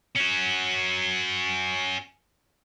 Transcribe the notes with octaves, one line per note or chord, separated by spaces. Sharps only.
C#4 F#4